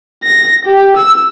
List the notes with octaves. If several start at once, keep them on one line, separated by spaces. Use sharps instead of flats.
A#6
G4
E6